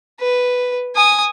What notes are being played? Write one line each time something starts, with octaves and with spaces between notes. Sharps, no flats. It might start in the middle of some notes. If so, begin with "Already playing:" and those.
B4
G#5 D#6